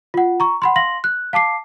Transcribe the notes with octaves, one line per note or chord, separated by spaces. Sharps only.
F4 F#5
A#5 C#6
F#5 B5 C6
F5 C6 A#6 F#7
F#6
F5 A5 D6 C7